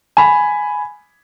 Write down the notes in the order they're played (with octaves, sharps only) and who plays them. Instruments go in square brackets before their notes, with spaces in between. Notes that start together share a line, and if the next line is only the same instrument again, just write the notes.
[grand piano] G#5 B5